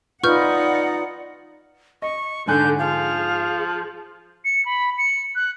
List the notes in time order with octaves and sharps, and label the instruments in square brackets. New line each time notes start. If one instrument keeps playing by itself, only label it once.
[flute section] D#4 D5 [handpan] F4 B4 [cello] F#5 [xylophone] C#6 F6 G6
[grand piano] D#5 [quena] C#6
[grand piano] G#2 G#5 F#6 [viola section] D3 [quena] G6
[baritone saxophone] F3 [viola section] G#4 [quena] F5
[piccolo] C#7
B5
C#7
F#6